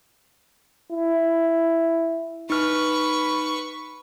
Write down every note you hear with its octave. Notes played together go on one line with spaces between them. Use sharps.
E4
D#4 B4 C#6 F6